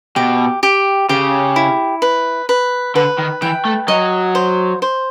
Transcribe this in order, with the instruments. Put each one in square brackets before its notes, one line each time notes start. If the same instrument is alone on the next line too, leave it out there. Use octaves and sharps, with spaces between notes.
[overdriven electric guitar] B2 [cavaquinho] G4
[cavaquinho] G4
[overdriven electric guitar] C#3 [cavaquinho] G4
[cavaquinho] E4
B4
B4
[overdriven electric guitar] D3 [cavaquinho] B4
[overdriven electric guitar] D#3
[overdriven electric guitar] E3 [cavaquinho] G5
[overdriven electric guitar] A3
[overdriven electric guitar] F#3 [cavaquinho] D#5
[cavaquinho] C5
C5